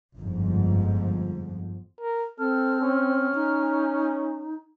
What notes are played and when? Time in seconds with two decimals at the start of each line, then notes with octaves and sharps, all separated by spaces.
0.17 G1 F2 G#2 F3
2.01 A#4
2.39 C4 A4 F6
2.81 C#4
3.35 D#4